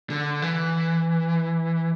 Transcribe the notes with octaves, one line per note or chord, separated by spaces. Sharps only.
D3
E3